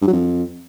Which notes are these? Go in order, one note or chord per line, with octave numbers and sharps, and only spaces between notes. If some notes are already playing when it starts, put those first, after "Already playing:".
G2
F#3
F2